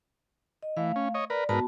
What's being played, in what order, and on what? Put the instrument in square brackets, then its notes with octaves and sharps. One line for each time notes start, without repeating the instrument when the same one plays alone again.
[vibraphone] D#5
[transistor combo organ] E3 [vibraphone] A3 F5
[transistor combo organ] C#4
C#5 D#5
[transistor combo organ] A#4 B4 [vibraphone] D5
[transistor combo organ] G#2 A#4 B4 [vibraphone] B3 F#4 A5